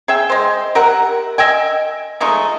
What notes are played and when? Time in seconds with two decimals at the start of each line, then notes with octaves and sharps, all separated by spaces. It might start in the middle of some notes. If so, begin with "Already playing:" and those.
0.08 G#4 E5 G5
0.30 G#3 C5
0.75 G4 A#4 E5 F#5
1.38 D#5 E5 G5 G#5
2.20 F3 G#3 A3 D#4